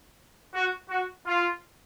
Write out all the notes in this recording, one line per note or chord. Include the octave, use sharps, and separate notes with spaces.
F#4
F#4
F4